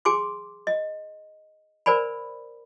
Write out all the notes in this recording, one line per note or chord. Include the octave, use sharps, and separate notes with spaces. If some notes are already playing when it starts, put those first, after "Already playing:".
G#4 G#5 C6 D6
D#5
A#4 C5 D5 G#5 B5